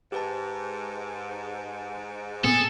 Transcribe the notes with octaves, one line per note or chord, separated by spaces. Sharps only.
G#2 G4 B4 A5
A#2 B3 C4 G#4 A4